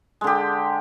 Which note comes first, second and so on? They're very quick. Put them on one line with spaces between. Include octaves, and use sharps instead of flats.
G#3 D3 G4